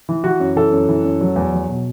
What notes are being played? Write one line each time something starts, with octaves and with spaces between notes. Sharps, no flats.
E3
E3 F#4
F#2
E3 A4
F#2
E3
F#2
F#3
E2
F#3
B2